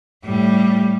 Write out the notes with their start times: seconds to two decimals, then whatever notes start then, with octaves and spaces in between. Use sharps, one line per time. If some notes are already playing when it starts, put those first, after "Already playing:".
0.24 A2 G3